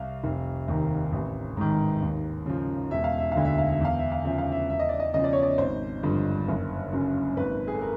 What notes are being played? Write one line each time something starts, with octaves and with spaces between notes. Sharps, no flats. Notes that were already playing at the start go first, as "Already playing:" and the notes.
Already playing: C2 F5
F1
D#2 D#3
A1
G#2 D#3
D#2
C#3 F3
E1 E5
F5
E5
D2 D3 F5
E5
F5
E5
E2 F5
E5
F5
C#3 F3 E5
F5
E5
E2 E5
D#5
D5
D#5
C#3 F3 D#5
D5
C#5
D5
G#1 C5
G2 D3 F3
F#1
F#2 C#3
G#1 B4
G#4
A4
A#4